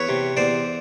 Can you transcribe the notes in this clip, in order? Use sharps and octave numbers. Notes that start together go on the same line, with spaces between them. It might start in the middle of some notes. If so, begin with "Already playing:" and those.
Already playing: E2 B4 C#5
C3
E2 C5 D5